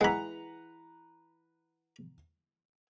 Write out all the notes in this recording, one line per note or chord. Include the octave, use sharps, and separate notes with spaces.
E3 G#3 G#4 B4 F#5 A#5 B5